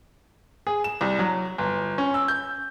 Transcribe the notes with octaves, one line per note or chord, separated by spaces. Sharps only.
G#4
E7
C2
F#3
G1
C#4
E6
G6